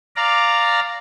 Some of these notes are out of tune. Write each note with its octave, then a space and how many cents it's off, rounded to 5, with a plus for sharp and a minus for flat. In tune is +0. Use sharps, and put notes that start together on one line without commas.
D5 +0 F5 +5 A#5 -10